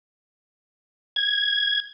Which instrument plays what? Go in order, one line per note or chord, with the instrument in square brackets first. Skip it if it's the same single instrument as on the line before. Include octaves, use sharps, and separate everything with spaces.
[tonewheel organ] G#6